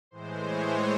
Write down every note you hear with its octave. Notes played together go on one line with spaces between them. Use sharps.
A2 E3 G#3 C5
C#5